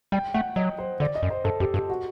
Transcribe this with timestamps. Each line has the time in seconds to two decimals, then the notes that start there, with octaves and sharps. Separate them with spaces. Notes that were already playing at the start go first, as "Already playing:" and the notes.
0.12 G3 G5
0.34 A3 F#5
0.56 F#3 D#5
0.78 C5
1.00 D3 D5
1.15 D#5
1.23 F#2
1.30 C5
1.44 G2 A4
1.60 F#2 G4
1.74 G2 G4
1.90 F#4